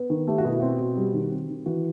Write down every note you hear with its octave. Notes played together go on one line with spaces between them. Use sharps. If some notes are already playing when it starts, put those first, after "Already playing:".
Already playing: B3
D#3
A3 G4
F#4
B2 E4
C4 F#4
B2
G3
D#3
C4
D#3
E3 F#4